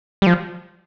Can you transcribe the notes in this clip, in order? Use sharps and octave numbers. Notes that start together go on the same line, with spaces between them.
G3
F3